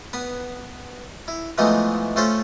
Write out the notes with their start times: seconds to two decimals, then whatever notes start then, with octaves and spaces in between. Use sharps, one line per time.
0.13 B3 B4
1.28 E4
1.58 E3 F3 G#3 A3 B3 D#4
2.16 A3 C#4 F4 A4 C5